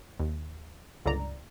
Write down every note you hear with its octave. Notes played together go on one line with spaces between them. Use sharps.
D#2
G1 C#2 D3 D5 A#5